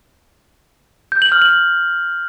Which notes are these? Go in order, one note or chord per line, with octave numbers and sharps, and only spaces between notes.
G6
F#7
F6
F#7